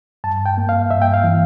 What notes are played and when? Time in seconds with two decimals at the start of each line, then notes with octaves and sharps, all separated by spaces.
0.24 G2 A5
0.46 G5
0.58 A#3
0.69 F5
0.91 G2 E5
1.02 G5
1.14 F5
1.24 E3